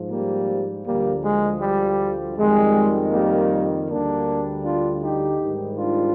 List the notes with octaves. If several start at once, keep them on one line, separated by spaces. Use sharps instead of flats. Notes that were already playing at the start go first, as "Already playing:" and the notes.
Already playing: G#2 F3
G3 A#3
D2 D3 F3 G3 A#3
G#3
G3
F2 D#3 G3 G#3
G3 A#3
D2 D3 G3 A#3 D4
D4 F4
D#4 G4
G#2 D#3 G3
D4 F4